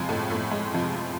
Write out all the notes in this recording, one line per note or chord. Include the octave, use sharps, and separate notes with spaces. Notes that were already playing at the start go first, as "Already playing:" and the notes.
Already playing: F2 C3 F3 G#3
A2 A3
A2 A3
G#3
F2 C3 F3